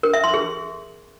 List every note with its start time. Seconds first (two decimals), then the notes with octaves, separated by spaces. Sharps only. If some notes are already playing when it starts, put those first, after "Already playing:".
0.03 A#4
0.14 E5
0.24 C6
0.34 G#4